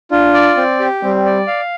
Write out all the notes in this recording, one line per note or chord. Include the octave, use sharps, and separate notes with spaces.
D4 F4
D5
C4
G4
G3 C4
D5
F5